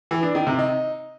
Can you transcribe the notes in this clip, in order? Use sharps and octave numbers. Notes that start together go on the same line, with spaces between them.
E3
D4
D#3
C3
D#4